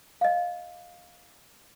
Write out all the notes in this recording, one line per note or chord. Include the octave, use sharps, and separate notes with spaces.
D#5 F5